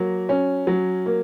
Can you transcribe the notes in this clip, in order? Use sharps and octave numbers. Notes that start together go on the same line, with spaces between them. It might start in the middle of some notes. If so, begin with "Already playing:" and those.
Already playing: F#3 A#3
C#4
F#3
A#3